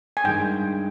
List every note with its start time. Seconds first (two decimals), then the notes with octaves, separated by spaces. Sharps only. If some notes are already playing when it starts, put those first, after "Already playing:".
0.17 G#5
0.24 G2 D#3 G#3 G5